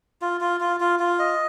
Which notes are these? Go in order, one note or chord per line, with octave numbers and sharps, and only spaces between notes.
F4
F4
F4
F4
F4
D#5